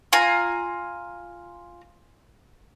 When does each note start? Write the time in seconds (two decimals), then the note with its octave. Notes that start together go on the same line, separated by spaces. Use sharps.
0.13 F4 G#5 A#5